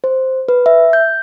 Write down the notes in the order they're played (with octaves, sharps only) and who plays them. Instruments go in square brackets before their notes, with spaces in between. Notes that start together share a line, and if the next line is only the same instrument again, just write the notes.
[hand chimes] C5
B4
E5
G6